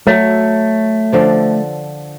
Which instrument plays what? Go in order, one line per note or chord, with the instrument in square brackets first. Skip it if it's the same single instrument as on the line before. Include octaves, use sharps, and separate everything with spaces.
[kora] F#3 [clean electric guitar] A3
[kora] D3 F3 D5